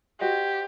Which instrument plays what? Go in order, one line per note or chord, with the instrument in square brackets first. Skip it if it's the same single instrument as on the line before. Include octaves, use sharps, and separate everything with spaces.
[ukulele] F#4 C5 D#5 F#5 [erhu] G4